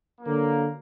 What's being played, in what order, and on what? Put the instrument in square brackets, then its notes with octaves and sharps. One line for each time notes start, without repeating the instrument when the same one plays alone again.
[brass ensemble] D3 F#3 A#3